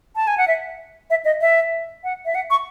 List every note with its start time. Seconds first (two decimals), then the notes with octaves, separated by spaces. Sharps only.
0.16 A5
0.27 G#5
0.38 F#5
0.48 E5
1.10 E5
1.25 D#5
1.41 E5
2.04 F#5
2.26 E5
2.35 F#5
2.50 C#6